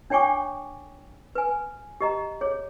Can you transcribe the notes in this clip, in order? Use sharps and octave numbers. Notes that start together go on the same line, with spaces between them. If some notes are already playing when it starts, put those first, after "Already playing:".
D4 C#5 G5 G#5 C#6 D6
B4 G#5
G4 D#5 A#5
G#4 C#5